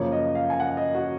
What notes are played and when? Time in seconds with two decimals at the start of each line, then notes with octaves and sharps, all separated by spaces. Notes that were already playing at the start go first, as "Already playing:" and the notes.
Already playing: F#2 C#3 F3 A#3 C#5
0.12 D#5
0.35 F5
0.50 G#5
0.60 F#5
0.77 D#5
0.95 F#4